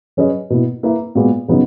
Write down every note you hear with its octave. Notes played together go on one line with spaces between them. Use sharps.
F#3 C#4 G#4 B4 D#5
B2 A#3 E4
A#3 E4 B4 E5
A#2 G#3 B3 F#4
C#3 F#3 B3 D#4